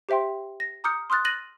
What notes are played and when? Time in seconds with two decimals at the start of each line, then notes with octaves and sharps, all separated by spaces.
0.09 G4 C5 E5 G5 C6
0.60 A#6
0.84 A#5 D6 D#6 F6 G6 C#7
1.10 C6 D#6 F6 F#6 A6
1.25 F#6 A6 A#6 D#7 F#7